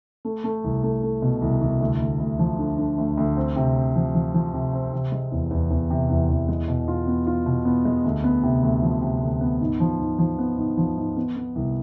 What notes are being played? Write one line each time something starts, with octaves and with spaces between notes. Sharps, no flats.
A3
A3
C2
A3
A3
B2
C2
C2
D2
D2
D2
F3
D3
D3
D2
D2
C4
C3
C4
F3
F3
F3
C3
C4
C3
G#3
E2
E2
E2
C3
E2
E2
G#3
B2
F4
B3
F4
B2
B3
G#3
D2
B3
C3
D2
F3
C3
D2
B3
G#2
F3
G#2
F3
B3
G#2
F3
G#2
B3
B3
C2